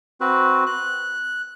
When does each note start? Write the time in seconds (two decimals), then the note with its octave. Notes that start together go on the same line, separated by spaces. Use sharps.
0.21 C4 F#4 B4
0.66 F#6